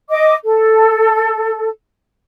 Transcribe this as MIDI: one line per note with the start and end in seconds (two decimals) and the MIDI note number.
0.10 0.34 75
0.10 0.34 86
0.45 1.68 69